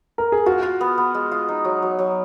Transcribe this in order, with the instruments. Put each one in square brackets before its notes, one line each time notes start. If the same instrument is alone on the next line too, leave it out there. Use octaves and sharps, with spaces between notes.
[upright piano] A#4
G#4
[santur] F4 [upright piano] F#4
[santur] F4
B3
B3
G#3
F4
D#4
F#3
F#3
F#3